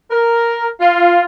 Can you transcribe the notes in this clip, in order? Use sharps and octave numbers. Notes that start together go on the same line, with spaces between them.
A#4
F4